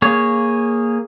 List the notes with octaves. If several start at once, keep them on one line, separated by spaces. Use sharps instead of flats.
A#3 G#4 C#5